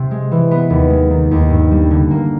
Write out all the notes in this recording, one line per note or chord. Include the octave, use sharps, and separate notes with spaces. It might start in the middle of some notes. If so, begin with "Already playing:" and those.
Already playing: C3 C4
G#3
E3
B3
D#2
G#3
D#3
D#2
G2
G3
D3
A#3